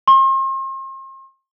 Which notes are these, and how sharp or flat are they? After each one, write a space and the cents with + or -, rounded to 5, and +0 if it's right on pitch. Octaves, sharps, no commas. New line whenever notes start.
C6 +40